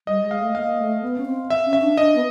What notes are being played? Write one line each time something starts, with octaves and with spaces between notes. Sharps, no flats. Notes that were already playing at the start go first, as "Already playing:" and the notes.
G3 D#5
G#3
F5
A3
A#3 F5
A3
B3
C#4
C4
E5
C#4
E5
D4
D4 D#5
B3